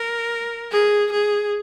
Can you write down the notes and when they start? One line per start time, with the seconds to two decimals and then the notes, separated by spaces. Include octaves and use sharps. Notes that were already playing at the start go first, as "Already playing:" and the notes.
Already playing: A#4
0.71 G#4
1.12 G#4